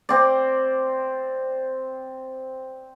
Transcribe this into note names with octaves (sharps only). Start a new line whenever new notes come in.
C4 D5